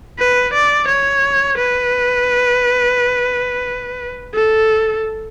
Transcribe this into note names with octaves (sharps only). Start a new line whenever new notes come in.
B4
D5
C#5
B4
A4